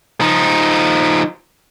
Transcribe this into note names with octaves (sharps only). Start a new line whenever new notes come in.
F3 D#4